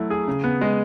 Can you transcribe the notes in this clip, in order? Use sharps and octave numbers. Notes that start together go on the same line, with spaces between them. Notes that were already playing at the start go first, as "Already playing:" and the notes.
Already playing: F#3 A3 E4
G#4
C#3
B3
G#3